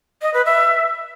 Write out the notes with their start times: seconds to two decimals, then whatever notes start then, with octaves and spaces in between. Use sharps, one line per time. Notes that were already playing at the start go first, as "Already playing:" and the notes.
0.22 D#5
0.34 B4
0.46 E5